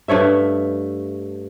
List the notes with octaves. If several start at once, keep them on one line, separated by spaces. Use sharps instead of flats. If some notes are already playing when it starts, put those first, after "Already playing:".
G2 A3 C#5 E5